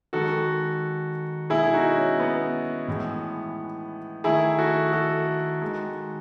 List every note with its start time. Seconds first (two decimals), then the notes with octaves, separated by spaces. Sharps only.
0.13 D#3 G#3 F#4 A4
1.50 B2 G#3 E4 G#4
1.63 G#4
1.73 D#4 F#4
1.96 C#4
2.20 B3
2.88 A2 E3 G#3
4.24 D#3 A3 E4 G#4
4.58 F#4 A4
4.93 F#4 A4
5.62 D#3 G#3